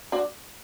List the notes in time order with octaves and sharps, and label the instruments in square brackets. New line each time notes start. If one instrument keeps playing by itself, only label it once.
[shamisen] D4 F#4